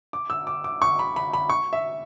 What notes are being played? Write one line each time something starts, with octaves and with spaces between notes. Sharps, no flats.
D6
E6
D6
D6
C#6
B5
B5
B5
C#6
E5